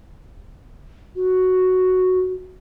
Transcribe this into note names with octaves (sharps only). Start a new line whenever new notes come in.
F#4